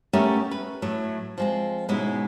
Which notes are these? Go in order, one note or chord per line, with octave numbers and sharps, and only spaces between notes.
A3 B3 C#4 G4 A4 A#4
B4
A2 F#3 A3
F3 G#3 C4
G#2 B2 G#3 B3 C#4 E4